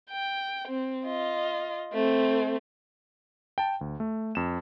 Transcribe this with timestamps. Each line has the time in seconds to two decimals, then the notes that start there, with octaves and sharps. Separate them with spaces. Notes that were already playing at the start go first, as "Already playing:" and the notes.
0.11 G5
0.68 C4
1.07 F4 D#5
1.93 A3 C4
3.58 G5 A5
3.81 D2
4.00 A3
4.35 F2 E7